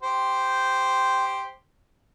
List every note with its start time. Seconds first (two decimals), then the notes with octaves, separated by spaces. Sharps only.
0.03 G4 C5